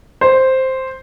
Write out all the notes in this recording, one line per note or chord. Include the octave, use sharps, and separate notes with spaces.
C5